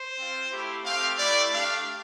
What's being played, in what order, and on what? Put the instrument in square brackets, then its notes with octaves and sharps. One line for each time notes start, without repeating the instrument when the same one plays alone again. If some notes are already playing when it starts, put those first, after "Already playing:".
Already playing: [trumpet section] C5
C4 F4
A3 E4 G4
A3 C4 G4 F5
A3 E4 G4 D5
A3 D4 G4 F5